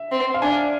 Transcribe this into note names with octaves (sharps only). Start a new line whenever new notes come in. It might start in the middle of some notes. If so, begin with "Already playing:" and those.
Already playing: E5
C4
F5
D4 G#5